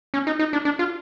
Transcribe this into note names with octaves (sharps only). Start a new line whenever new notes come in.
C#4
D#4
D#4
D4
D4
F4